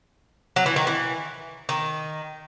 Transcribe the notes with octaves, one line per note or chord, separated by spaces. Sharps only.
F#3
E3
D#3
E3
D#3